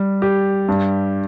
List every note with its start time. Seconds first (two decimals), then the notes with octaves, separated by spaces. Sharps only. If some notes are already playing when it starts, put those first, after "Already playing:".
Already playing: G3
0.22 G4
0.68 G2